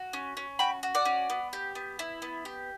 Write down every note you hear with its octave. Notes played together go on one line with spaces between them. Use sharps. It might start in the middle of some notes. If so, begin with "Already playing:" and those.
Already playing: F#4
C#4
C#4
F#4 G5 B5
F#4
D5 F#5
C#4
B3
G4
B3
E4
B3
G4